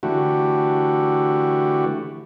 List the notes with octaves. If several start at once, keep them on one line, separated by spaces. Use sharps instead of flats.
D3 E3 A3 F#4 G4